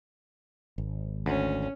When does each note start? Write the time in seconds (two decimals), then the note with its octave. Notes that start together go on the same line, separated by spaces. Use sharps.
0.78 G#1
1.26 D2 C#4